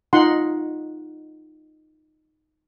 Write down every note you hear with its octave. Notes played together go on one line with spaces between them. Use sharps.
D#4 F4 F#5 C6